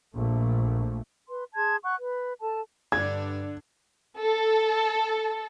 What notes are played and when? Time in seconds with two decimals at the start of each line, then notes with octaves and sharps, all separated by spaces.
0.14 A#1 A3
1.28 B4 C6
1.54 G#4 A5 C6 G#6
1.84 F#5 C#6 F#6
1.98 B4
2.41 A4 A5
2.92 G2 D3 D4 G#6
4.19 A4